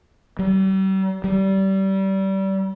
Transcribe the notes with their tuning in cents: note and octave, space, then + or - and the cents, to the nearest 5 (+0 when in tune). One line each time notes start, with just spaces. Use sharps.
G3 -40
G3 -25